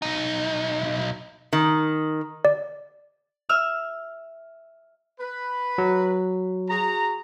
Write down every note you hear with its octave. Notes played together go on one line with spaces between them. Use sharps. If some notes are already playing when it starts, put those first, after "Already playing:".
B1 D#4
D#3
D5
E5 E6 F6
B4
F#3
F#4 G#4 A#5